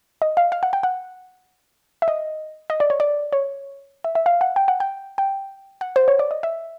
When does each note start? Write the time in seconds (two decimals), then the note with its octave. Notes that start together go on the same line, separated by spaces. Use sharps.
0.22 D#5
0.37 F5
0.52 F5
0.63 F#5
0.73 G5
0.83 F#5
2.02 E5
2.08 D#5
2.70 D#5
2.80 D5
2.90 C#5
3.00 D5
3.32 C#5
4.04 E5
4.15 E5
4.26 F5
4.41 F#5
4.56 G5
4.68 F#5
4.80 G5
5.18 G5
5.81 F#5
5.96 C5
6.08 C#5
6.19 D5
6.31 D#5
6.43 E5